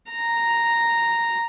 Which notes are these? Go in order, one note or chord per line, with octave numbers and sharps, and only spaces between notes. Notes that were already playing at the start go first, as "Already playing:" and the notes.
A#5